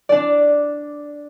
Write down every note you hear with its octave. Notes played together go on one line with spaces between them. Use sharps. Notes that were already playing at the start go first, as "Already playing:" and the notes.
D4 D5